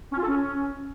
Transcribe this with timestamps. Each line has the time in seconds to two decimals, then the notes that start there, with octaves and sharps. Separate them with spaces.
0.12 C#4
0.18 F4
0.23 A4
0.28 C#4